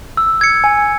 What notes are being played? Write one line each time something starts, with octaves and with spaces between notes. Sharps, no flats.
E6
G#6 C#7
G#5